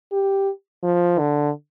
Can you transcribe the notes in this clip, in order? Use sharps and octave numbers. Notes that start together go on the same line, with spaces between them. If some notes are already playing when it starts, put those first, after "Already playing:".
G4
F3
D3